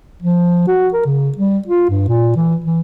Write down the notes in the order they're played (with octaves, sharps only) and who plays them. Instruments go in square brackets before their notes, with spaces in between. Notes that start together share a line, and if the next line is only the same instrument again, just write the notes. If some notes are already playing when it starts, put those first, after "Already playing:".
[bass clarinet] F3
F#4
A#4
C#3
G3
F4
G2
A#2
E3
E3